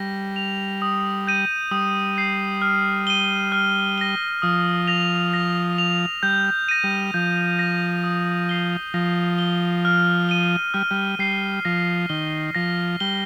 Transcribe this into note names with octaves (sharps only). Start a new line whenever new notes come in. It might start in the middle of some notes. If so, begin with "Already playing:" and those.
Already playing: G3 A#6
F7
D#6
G6 A#6 D#7
G3 D#6
G6 C7
F6
D#7 G7
F6
A#6 G7
F3 D#6
A#6 F7
A#6
F7
G3 G6
A#6 D#7
G3
F3 G6
A#6 F7
D#6
C7 G7
F3 A#6
G7
F6
D#7 G7
G3 F6
G3
G3 C7 G7
F3 A#6
D#3 G7
F3 A#6
G3 G7